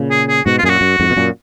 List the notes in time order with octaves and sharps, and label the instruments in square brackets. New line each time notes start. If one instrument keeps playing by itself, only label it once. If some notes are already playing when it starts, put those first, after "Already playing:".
Already playing: [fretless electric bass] A#2 C#3
[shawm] G#4
G#4
[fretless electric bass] G#2 B2 [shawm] F#4
[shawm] F4
[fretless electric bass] F#2 A#2 [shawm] G#4
[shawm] F#4
[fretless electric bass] F#2
F2 G#2
B2
F#2 A#2